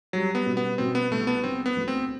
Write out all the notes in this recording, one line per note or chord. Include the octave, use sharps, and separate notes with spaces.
F#3 G3
B3
B2
B3
B2 C4
B3
C2 A3
B3
D3 C4
B3
D2
C4